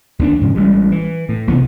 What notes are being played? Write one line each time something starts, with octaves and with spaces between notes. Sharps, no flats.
D#2 D#3 B3 D4
G#2 C#3 F3
A1 G3 G#3
E3
A2
B1 C3 E3 B3